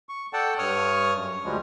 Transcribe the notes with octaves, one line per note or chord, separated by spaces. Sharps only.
C#6
A4 D5 F#5 G5 A5
G2 C#5 C#6 D#6 F6
F#2
D2 F3 G3 G#3